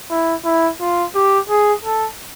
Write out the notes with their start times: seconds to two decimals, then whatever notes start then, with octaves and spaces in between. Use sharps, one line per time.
0.11 E4
0.45 E4
0.81 F4
1.15 G4
1.49 G#4
1.84 A4